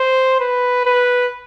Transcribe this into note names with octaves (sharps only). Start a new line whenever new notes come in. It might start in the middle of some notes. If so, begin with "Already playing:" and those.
Already playing: C5
B4
B4